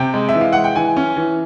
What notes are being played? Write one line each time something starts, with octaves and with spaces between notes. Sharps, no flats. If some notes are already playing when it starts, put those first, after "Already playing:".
Already playing: C3 G5
G#3
E5
E3
F5
G#3 F#5
G5
E3 G#5
C#4
E3